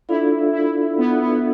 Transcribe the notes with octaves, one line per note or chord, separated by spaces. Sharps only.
D4 E4 F4 A4 D5 F5
E4
B3
B3